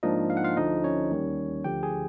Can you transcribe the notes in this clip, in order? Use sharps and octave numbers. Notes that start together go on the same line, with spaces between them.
G#2 F3 A#3 D4 D#4 D#5
F5
F#5
F4 F5
D2 D3 F3 A3 D#4 D#5
C#4 C#5
D#2 D#3 G3
D2 D3 F3 G4 G5
G#4 G#5